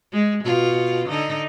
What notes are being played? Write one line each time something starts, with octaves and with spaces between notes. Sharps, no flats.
G#3
B2 F4
D3 D#4